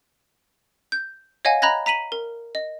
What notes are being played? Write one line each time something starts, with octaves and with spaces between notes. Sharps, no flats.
G6
C#5 D#5 F5 F#5 G#5
D#5 A#5 B5 F#6 G#6 A#6
A#5 B6 D#7 F#7
A#4
D#5